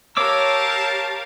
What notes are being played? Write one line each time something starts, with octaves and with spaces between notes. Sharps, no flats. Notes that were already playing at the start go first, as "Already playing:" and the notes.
G4 A#4 C#5 F5 A5 D6 E6